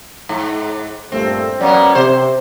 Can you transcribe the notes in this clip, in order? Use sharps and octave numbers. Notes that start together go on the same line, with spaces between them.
G#2
G2 A#2 A3 C4
F#3 A#3 B3 C#4 C#5 D5
C3 C5